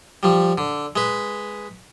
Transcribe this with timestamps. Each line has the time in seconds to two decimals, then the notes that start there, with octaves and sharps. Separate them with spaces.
0.23 F3 G3
0.58 D3
0.96 G#3 B4